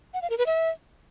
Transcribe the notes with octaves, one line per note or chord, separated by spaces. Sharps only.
F#5
F5
A#4
B4
E5